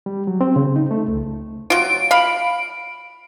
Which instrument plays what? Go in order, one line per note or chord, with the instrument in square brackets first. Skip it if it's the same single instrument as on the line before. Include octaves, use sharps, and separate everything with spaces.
[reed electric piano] G3
F#3
C4
C#3
D#4
A3
C#2
[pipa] F#3 F4 [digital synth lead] D7
[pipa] F5 B5